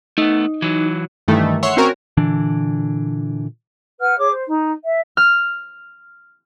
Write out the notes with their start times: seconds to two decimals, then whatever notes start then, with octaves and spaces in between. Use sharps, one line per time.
0.18 A3 B3 D#4
0.62 E3 F#3
1.28 G2 D#3 E3 A3
1.63 C#5 E5 F#5 C6 C#6
1.77 C4 C#4 F#4 A#4 C#5
2.17 A#2 D3 E3 D4
4.00 B4 F#5 F6
4.18 G#4 C#5 D6
4.30 C5
4.46 D#4
4.84 E5
5.17 F6